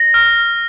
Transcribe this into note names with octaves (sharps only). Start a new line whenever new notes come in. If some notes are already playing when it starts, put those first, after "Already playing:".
Already playing: A#6
F6